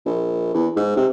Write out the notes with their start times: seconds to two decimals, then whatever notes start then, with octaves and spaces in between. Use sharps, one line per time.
0.06 A#1
0.54 E2
0.77 G#2
0.97 C3